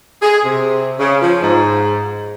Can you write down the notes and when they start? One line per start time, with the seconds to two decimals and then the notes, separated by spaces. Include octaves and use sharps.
0.22 G#4
0.45 C3
0.99 C#3
1.21 F3
1.42 G#2